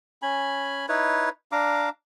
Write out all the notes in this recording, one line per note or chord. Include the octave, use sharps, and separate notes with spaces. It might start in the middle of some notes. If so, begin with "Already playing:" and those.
C#4 G#5 B5
D#4 E4 B4 C#5
D4 F5 A#5 D6